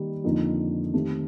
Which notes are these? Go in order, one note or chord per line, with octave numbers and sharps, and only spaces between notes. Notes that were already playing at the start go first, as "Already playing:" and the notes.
Already playing: D#3 G3 A#3 D#4
F2 D3 F3 A#3 D#4
D#3 A3 C4 G4